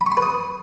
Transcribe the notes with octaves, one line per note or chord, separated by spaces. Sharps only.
B5
C#6
C6
B4
D#6